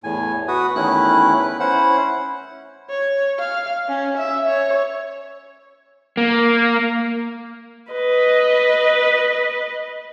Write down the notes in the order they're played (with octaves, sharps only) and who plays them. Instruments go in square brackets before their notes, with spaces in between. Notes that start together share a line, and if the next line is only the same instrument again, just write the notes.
[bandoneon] E2 A2 G#5
F#4 B4 D#6
E2 D#3 A3 C#4 E4 F#6
B4
C#4 E4 C5 F#5
[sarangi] C#5
F5
C#4
E5
C#5
[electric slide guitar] A#3
[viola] B4 D#5